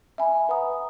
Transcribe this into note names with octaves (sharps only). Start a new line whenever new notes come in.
E5 G#5 B5
B4 F#5 A#5 D#6